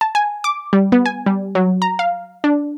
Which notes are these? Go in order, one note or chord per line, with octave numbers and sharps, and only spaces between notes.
A5
G#5
D6
G3
B3
G#5
G3
F#3
A#5
F5
D4